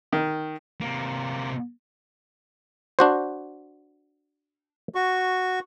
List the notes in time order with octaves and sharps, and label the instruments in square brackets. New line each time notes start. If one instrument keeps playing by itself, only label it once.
[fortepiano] D#3
[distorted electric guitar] C3 A#3
[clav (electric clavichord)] D4 F#4 C5
[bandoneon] F#4 C#6